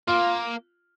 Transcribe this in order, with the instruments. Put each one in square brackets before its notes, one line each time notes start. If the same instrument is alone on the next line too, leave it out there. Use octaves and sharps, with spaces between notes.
[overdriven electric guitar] A#3 [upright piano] F4